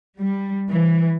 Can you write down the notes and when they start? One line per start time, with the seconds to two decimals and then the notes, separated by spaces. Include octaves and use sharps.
0.18 G3
0.70 E3